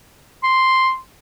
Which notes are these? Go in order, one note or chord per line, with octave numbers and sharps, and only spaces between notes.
C6